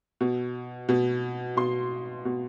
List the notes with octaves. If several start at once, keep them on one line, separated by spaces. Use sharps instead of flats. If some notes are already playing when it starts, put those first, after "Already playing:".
B2
B2
B2 C6
B2